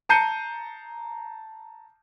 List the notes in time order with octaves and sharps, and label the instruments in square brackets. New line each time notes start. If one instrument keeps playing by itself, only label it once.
[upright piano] A5 A#5 G6 C7 C#7 D#7